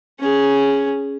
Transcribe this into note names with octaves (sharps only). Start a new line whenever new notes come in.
C#4 G#4